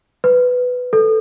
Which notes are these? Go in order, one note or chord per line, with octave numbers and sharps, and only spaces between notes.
B4
A4